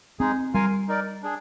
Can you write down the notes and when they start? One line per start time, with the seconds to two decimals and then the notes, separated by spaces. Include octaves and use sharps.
0.20 G#3 C4 D#4 G#4
0.54 G3 F4 A#4 F5 G#5
0.88 D#4 A#4 D5
1.23 D4 G#4